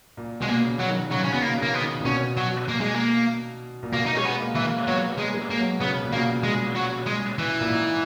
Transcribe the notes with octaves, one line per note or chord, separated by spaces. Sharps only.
A#2
B2 G#3
A#3
C#3
F#3
D#3
C#3 F#3
C#4
B2 B3
A#3
C#3
A#3
B3
D#3
A#2
B2 C#4
F#3
A#3
G#3
A#3
A#2
B2 A#3
D#4
G#3 C#4
B3
A#3
E3
A#3
F#3 B3
A#3
G#3
G#3
A#3
F#3
C#3 B3
B2
A#2
B2 A#3
G#3
F#3
G#3
E3
A#2
G#2